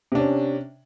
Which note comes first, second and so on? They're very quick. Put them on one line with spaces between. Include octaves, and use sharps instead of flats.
C3 D4 C#4